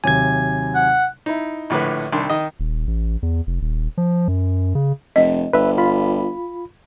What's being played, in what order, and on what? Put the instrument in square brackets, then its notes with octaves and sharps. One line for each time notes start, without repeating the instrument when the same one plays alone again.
[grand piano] D#2 C3 F#3 [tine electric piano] G#5 G#6
[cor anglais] F#5
[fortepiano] D#4 E4
A#1 A2 D3 B4
C2 D#3 D4 C6
D#3 D#5
[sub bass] D#1
A1
E2
F1
D#1
F3
F#2
C#3
[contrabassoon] F1 [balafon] D#5
[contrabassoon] G1 [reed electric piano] B4 E5
[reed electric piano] F4 B5